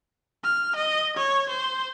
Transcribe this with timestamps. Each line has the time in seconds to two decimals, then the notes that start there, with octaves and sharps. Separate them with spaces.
0.44 F6
0.76 D#5
1.17 C#5
1.49 C5